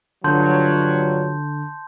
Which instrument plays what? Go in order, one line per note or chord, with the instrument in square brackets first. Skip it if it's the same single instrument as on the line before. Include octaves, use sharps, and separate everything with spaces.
[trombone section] G2 F3 F#3 [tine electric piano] D3 [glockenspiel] A5 C6 G6